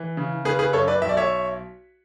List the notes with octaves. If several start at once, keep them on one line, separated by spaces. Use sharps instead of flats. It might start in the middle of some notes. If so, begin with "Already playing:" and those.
Already playing: E3
C#3
C#3 G#4 B4
G#4 B4
F#2 A4 C#5
B4 D5
B1 E5
D5
C#5 E5